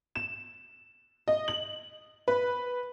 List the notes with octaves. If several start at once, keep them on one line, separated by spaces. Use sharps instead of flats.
E7
D#5
F#7
B4